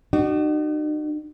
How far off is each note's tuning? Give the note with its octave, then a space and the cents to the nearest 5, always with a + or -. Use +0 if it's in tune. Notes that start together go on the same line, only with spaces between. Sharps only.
D#4 -45 F#4 +30